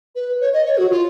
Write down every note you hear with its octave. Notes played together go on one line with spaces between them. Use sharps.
B4
C#5
D#5
C#5
F#4
F4